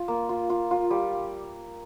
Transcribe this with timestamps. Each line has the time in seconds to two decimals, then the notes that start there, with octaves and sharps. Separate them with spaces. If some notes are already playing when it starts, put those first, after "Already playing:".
Already playing: F4
0.08 A#3
0.29 F4
0.50 F4
0.71 F4
0.91 G3